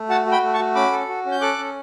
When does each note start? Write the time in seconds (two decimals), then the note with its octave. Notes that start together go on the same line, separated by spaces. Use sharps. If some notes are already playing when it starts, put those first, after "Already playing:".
Already playing: A3
0.09 F#4 F#5 A5
0.26 F#4
0.31 G5 B5
0.43 A3
0.54 A5 C#6
0.59 F#4
0.75 C#4 B5 D6
0.92 A4
1.08 F#4
1.26 C#4
1.31 G6
1.41 A4 D6 F#6
1.58 C#4